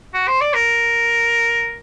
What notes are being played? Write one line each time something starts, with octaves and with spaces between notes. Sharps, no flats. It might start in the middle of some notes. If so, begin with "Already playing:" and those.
F#4
C5
D5
A#4